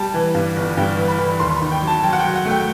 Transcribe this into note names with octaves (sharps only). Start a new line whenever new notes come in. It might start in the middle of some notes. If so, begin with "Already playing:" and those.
Already playing: G3 A5
E3
G2
G1
G2 G5
E3
B5
E3
D#2 C6
B5
D#3
G5
F#3
A5
F#3 G5
F#5
G5
F#3
F#5
A3
G5